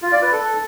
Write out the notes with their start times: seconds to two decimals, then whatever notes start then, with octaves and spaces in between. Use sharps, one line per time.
0.02 F4
0.12 D5
0.22 B4
0.32 A4